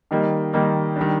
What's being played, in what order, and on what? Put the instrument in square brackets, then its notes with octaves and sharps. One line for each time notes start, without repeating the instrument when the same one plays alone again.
[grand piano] D#3 G3 A#3 D#4
D#3 G3 A#3 D#4
D#3 G3 D4